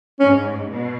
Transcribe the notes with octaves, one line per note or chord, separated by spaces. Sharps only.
G#2 C#4
B2